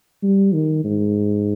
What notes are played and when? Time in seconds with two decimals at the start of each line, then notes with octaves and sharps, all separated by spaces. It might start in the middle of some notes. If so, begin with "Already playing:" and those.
0.23 G3
0.54 D#3
0.85 G#2